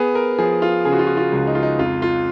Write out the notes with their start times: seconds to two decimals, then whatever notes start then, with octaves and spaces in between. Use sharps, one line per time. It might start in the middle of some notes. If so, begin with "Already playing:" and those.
Already playing: B3 G#4
0.15 A#4
0.39 F3 G#4
0.62 F4
0.85 C#3 G#4
0.92 F#4
0.99 F4
1.07 F#4
1.17 F4
1.32 C#2
1.47 D#4
1.55 F4
1.63 D#4
1.79 F2 F4
2.02 F4